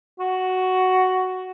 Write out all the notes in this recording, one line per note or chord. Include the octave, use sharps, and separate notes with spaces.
F#4